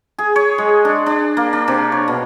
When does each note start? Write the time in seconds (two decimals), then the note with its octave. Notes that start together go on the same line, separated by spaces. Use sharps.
0.18 G#4
0.36 C#5
0.58 G#3
0.85 D4
1.06 D4
1.37 A#3
1.53 D4
1.68 C3
1.92 C#5
2.08 B2